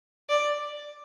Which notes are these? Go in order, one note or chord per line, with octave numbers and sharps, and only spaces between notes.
D5